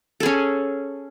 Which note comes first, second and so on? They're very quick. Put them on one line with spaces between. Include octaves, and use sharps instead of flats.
A4 G#4 C#4